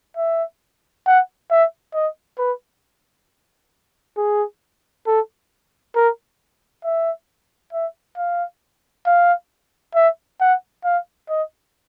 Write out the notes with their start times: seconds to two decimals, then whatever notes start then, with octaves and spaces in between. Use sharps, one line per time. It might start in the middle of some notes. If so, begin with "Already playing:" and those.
0.17 E5
1.06 F#5
1.51 E5
1.94 D#5
2.39 B4
4.17 G#4
5.07 A4
5.96 A#4
6.84 E5
7.73 E5
8.17 F5
9.06 F5
9.95 E5
10.41 F#5
10.84 F5
11.29 D#5